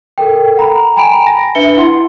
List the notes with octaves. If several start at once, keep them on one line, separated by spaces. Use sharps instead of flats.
A4 A#4 G5
F#5 A#5 B5
G5 G#5 A#5 B5 D7
A#6
D4 B4 E5 C#7 G7
E4 F#5 C6